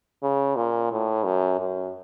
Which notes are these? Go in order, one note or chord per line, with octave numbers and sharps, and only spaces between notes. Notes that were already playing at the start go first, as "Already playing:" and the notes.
C#3
A#2
A2
F#2
F#2